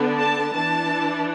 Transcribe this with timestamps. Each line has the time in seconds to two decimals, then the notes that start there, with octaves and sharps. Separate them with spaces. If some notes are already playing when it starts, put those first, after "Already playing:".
Already playing: D3 B3 D4
0.20 A5
0.53 E3 D4 A5